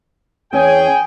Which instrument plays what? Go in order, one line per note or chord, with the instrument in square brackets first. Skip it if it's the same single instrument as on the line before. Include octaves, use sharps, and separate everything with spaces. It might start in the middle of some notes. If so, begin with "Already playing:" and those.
[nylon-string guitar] E2 C#4 [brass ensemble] G#4 G5 G#5